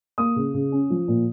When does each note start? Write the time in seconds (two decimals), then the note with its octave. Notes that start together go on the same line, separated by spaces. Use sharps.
0.18 A#3 D#6
0.36 C#3
0.54 C#3
0.72 C#4
0.90 F3
1.08 A#2